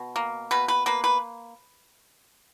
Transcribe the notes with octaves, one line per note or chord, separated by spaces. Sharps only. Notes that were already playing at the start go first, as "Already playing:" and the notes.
Already playing: B2
A#3
B2 B4
B4
A#3 B4
B4